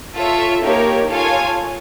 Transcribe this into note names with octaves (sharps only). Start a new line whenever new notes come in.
F4 A4 C#5 E5
A#3 D#4 G4 A#4 C#5
F4 A4 C#5 F5 G#5